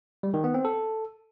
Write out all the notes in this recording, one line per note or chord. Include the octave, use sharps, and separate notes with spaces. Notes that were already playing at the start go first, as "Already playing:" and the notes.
G3
D#3
B3
C4
A4